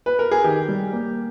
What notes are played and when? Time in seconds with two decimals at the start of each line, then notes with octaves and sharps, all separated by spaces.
0.06 B4
0.19 A#4
0.31 G#4
0.44 D#3 G4
0.68 G3
0.93 A#3